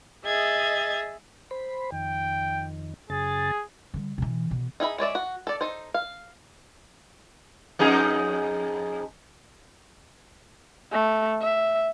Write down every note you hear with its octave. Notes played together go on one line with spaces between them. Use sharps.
G#4 D#5 E5 G#6 A6
C5 B5
F2 D#3 G5
F#2 C#3 G#4 A6
D3 G3
B2 E3
B2
D#4 G#4 E5 B5
G#3 C#5 D5 E5
F#4
A4 D5
D#4 A4 C5
F5
F2 D#4 G#4
A3
E5